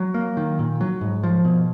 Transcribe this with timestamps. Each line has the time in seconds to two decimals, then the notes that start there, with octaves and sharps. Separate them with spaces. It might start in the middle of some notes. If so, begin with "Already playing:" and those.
Already playing: F#3
0.14 A#3
0.37 D#3
0.59 A#2
0.81 F#3
1.01 G#2
1.23 F3
1.45 B2